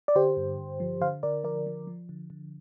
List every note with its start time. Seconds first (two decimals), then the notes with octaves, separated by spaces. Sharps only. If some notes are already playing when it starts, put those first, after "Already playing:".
0.08 D5
0.15 D3 G4 C5
0.37 G2
0.58 G2
0.80 F3
1.01 D3 C5 F5
1.23 D3 A#4 D5
1.44 F3 A#4 D5
1.66 F3
1.87 F3
2.09 D3
2.30 D3